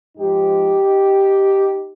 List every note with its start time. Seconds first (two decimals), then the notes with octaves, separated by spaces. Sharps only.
0.17 G#2 F3 G#3 D#4 G4